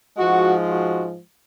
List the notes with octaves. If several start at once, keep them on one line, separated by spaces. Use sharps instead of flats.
G#2 F3 G#3 F#4
F#4